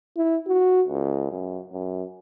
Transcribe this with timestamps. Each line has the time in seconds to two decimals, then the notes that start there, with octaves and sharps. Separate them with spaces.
0.17 E4
0.47 F#4
0.88 C#2
1.31 F#2
1.72 F#2